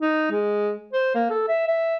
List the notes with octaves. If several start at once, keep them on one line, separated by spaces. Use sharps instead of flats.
D#4
G#3
C5
A#3
A4
E5
E5